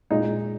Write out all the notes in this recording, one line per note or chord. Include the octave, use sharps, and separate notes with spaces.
A#2 G#3 D#4